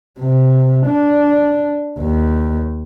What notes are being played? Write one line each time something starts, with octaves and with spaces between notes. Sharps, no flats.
C3
D4
D#2